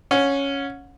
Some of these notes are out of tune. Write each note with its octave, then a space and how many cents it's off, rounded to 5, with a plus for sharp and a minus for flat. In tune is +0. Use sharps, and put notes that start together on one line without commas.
C#4 +0 F#5 -35